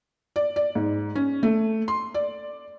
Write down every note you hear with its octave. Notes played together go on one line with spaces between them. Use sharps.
D5
D5
G#2
C#4
A3
C6
D5